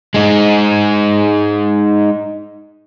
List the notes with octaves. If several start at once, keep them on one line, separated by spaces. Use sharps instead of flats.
G#3 D#4